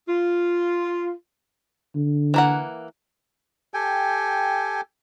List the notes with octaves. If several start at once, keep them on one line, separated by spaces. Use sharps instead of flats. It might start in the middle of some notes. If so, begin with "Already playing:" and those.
F4
D3
E3 A#3 F#5
G4 A4 G5 G#5